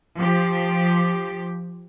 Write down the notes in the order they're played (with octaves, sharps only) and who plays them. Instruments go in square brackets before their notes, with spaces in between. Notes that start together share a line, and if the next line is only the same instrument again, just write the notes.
[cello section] F3 G4